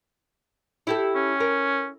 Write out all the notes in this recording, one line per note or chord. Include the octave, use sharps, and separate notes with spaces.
E4 G4 A4
C#4
A#4